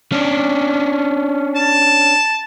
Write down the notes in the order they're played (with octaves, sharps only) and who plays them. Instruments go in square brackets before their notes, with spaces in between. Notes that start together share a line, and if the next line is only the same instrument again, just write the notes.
[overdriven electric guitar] C#4 D4
[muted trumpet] A5